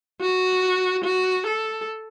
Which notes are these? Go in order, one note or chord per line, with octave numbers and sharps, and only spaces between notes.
F#4
F#4
A4